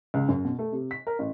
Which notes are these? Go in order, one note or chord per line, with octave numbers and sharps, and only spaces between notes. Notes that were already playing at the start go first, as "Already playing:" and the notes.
C#2
F#2
B2
A3
C3
B6
A#4
A1